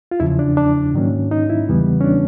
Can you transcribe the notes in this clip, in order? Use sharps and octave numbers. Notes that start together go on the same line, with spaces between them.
F4
E2 C#3 F3 E4
D4
D4
G#2 D#3 F#3 A#3 C#4
D#4
E4
E2 C#3 E3 G3 B3
C#4
D4